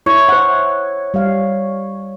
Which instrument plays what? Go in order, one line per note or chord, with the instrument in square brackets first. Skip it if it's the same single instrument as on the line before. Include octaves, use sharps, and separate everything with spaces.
[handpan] E4 [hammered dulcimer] C#5
[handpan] C5 F#5
G3 F5